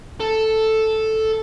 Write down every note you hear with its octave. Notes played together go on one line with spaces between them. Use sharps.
A4